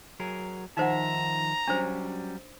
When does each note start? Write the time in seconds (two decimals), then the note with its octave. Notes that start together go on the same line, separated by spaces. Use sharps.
0.20 F#3 G#4 A#4
0.77 D#3 F3 D#4 C5 E5 F#5 A#5
1.68 F#3 G3 C#4 D4 C5